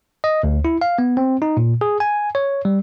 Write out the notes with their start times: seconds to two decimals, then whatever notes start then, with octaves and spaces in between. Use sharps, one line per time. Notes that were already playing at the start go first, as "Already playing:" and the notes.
0.24 D#5
0.43 D2
0.65 E4
0.81 F5
0.99 B3
1.17 C4
1.42 D#4
1.57 A#2
1.81 G#4
2.00 G#5
2.35 C#5
2.65 G3